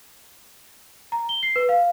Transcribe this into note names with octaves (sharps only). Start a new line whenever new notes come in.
A#5
G7
C7
B4
F5